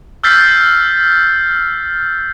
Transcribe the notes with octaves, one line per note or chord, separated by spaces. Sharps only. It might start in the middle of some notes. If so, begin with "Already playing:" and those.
E6 F6 G6 A6 B6 C7